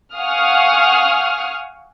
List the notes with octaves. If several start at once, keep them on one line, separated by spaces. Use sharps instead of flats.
F5 F#5 G#5 C#6 D#6 F6